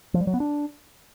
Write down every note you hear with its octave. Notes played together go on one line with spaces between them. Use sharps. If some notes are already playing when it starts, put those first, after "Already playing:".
F3
G3
F#3
B3
D4